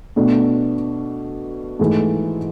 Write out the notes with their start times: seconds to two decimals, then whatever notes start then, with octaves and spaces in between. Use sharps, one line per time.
0.16 B2 A3 D4
1.79 G#2 E3 A3 E4